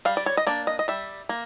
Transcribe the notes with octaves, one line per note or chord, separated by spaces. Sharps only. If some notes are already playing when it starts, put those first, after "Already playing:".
G3 F5
D5
C#5
D#5
A#3 D4 D5
D#5
D#5
G3 E5
A#3